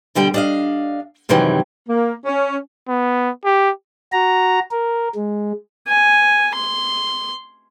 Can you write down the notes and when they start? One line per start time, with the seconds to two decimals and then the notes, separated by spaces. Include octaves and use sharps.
0.15 B2 D3 G3 G5
0.34 D4 D#5 F5
1.29 F#2 C3 D#3 E3 F#3 G3
1.89 A#3
2.26 C#4
2.88 B3
3.45 G4
4.12 F#4 A#5
4.71 A#4
5.15 G#3
5.88 G#5
6.55 C6